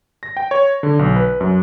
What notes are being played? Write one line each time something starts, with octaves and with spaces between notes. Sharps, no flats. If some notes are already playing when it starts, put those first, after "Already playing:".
A#6
G5
C#5
D3
B1
B4
F#2